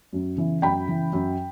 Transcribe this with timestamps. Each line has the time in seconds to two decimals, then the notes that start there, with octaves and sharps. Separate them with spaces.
0.13 F#2
0.37 C#3 E3
0.62 F#2 G5 B5
0.87 C#3 E3
1.13 F#2